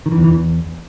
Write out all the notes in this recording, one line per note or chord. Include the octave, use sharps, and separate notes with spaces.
D#3
E3
E2
E3
E2